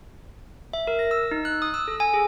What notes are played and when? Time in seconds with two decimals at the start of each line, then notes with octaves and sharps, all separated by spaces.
0.73 E5
0.87 A#4
0.99 A#6
1.11 E6
1.31 D#4
1.45 F#6
1.62 D#6
1.74 E6
1.88 A4
2.00 G#5
2.14 G#4